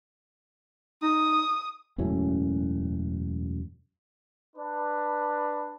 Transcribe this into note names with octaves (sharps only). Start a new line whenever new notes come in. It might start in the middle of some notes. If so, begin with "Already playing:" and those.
D#4 D#6
E1 F#2 A2 C#4
D4 B4